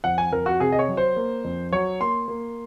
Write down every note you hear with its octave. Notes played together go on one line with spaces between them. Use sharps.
F2 F#5
G#5
F2 A#4
F#4
C3 G#4
D#5
C#5
F#3
C5
A#3
F2
F#3 C#5
A#3 C6
A#3